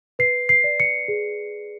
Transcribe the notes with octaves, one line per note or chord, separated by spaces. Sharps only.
B4 C7
C7
D5
C#7
G#4